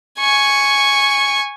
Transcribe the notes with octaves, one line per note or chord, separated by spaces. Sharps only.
G#5 C#6